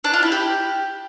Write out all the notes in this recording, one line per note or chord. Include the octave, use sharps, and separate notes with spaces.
D4
F4
E4
G4